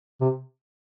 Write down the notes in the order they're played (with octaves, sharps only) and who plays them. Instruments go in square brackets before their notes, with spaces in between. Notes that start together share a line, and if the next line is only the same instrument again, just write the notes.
[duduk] C3